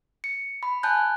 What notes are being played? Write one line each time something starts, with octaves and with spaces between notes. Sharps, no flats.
C#7
B5
G#5 A5 F#6 G6